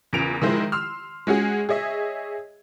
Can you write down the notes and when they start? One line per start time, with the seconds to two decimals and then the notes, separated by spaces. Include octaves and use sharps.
0.13 E2 A#2 C#3 D7 F7
0.42 D#3 F3 G#3 E4 C5
0.72 C6 E6 F6
1.27 G#3 C#4 F#4 G#4
1.69 G#4 C#5 D#5 E5